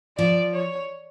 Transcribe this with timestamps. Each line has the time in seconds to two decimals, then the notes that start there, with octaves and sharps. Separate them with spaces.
0.18 F3 D5
0.54 C#5